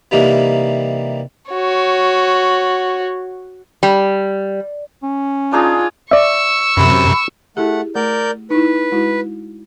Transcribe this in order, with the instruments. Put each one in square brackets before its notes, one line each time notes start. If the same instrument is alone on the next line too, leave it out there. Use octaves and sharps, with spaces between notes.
[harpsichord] C3 E3 G3 A#3 D#4 E4
[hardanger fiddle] F#4 C#5
[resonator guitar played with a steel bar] G3
[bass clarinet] C#4
[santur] D4 D#4 G#4 [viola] F4
[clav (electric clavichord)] D5 E5 [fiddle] C#6 E6
[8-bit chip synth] F#2 C3 [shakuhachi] B5
[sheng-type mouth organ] A3 F#5 [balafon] E4 G4 G#4
[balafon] A3 [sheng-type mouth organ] A#4 D5 G6
[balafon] D#4 E4 [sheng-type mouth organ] B4
[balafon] G#3 E4 F#4